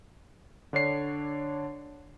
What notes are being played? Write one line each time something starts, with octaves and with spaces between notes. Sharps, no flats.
D3 D4 C#5 C7